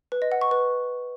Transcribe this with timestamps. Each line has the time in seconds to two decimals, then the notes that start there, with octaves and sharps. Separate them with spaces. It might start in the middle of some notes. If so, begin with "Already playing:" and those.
0.12 B4
0.22 D#5
0.32 F#5
0.41 C#6
0.51 B4